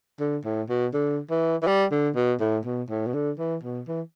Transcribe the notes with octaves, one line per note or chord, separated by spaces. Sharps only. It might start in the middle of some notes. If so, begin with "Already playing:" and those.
D3
A2
B2
D3
E3
E3
G3
D3
B2
A2
B2
A2
B2
D3
E3
B2
E3